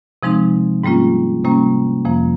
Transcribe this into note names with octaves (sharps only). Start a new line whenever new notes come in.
C3 F3 G#3 C4 D#4
G#2 G3 A#3 C#4 F4
C3 G3 A#3 C#4
F2 C3 F3 A#3